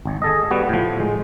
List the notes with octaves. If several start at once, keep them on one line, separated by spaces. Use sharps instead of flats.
G#1
G#4 A4 D#5
G3 B3 F#4
A2 F3
G#3